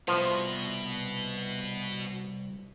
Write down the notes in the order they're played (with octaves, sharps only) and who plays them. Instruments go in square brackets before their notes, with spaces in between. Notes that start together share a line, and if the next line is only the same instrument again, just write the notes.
[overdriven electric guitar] C2 [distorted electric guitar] B2 [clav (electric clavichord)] F3